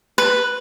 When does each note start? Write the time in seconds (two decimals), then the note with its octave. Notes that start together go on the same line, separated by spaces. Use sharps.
0.18 B4